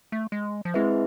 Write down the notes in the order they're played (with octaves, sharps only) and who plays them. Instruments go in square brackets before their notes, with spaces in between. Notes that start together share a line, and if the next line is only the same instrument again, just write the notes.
[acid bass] A3
G#3
F3
[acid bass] G#3 [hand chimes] C4 E4 G#4 B4 E5